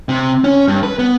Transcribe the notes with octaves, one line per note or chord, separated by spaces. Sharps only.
C3
C#4
G2
B4
B3